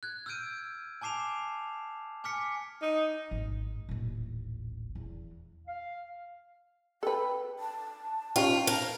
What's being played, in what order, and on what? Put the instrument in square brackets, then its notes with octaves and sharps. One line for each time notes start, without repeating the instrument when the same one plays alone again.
[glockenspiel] F#6 G#6
E6 F6 G6 G#6 D7 D#7
G#5 A5 D6 C7 E7 F7
G#5 D6 F6 B6 C#7
[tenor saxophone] D#4
[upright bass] G#1 G#2
D#1 A1
E2
[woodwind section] F5
[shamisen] A4 B4 [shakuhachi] G5
[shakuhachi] A5
[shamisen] C#4 D#4 G4 [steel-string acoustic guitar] F4
[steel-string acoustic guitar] A#4